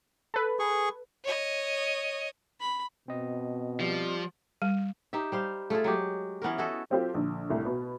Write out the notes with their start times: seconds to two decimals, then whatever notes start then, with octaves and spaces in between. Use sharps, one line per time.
0.34 A4 B4
0.59 G#4 C#6
1.24 C#5 D#5
2.60 B5
3.08 B2 C4 D#5
3.80 F3 G3
4.62 G3
5.13 D#4 G4 E5
5.32 G3 C5 F5
5.70 A3 F4 G#4 A4
5.84 F#3 G#3 G4
6.42 E3 B3 C#4 A#4
6.58 E4 F#4 A4 D#5
6.90 F#3 C4 F4 G4 A4 C5
7.14 A#1 D3
7.49 C2 A2 A3
7.65 B2 B3